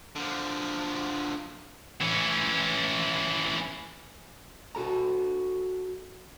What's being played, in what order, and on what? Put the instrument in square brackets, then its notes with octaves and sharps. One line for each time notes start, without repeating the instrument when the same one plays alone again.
[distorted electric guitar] D3 F3
E3 C#4
[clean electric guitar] F#4 A4 A#5